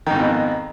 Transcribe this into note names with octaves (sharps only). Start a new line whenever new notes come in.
F2 G#2 B2 D#3